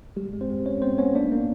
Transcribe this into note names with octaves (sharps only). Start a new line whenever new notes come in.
G3 G#3 G4
G#3
C4 C5
G#3
G#3 C#4 C#5
B3 C4 C5
B3 C#4 C#5
A#3 D4 D5
A#3